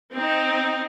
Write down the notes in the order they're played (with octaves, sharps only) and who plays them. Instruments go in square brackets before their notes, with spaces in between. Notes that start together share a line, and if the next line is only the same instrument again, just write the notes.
[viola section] C4 D#4